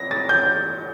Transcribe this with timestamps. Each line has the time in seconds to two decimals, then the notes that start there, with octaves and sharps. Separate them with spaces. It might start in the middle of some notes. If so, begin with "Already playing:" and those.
Already playing: A#6
0.11 A6
0.29 G6